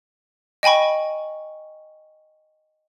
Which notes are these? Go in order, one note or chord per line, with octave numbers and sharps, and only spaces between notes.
D#5 G5 G#5 B5 C#6